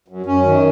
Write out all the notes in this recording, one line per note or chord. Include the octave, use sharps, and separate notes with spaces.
F#2
F#2 C#4
D#3